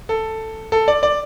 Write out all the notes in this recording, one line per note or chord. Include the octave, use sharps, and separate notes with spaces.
A4
A4
D5
D5